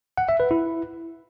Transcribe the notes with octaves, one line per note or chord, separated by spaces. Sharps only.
F#5
E5
B4
E4